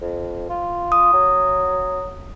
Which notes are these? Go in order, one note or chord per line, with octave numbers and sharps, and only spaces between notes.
F2
F4
D#6
F#3